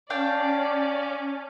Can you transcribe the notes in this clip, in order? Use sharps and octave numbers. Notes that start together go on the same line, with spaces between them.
C#4 D4 D5 F5 G5